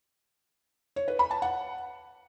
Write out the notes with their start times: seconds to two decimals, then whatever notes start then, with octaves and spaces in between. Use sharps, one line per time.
0.96 C#5
1.08 B4
1.19 B5
1.31 A5
1.42 F#5